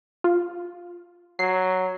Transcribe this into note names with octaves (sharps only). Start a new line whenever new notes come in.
F4
F#3 C7